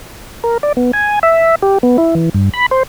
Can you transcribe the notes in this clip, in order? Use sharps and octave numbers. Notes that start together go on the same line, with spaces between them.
A#4
D5
B3
G#5
E5
G4
B3
E4
E3
G2
B5
C5